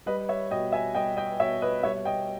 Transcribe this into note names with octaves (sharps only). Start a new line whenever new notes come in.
G3 B4 D#5
C#5 E5
B2 D#5 G5
E5 G#5
G3 D#5 G5
D#5 G5
B2 C#5 E5
B4 D#5
G3 C#5 E5
D#5 G5